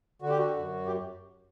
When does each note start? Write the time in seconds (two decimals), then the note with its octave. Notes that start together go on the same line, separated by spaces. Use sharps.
0.22 D3 F#4
0.30 G4
0.38 F#4
0.57 F#2
0.86 G4